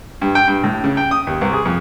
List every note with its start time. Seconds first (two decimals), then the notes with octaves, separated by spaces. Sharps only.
0.21 G2
0.35 G5
0.48 G2
0.64 A2
0.84 C#3
0.97 G5
1.11 D#6
1.27 D#2
1.41 C2
1.53 G#4
1.65 F2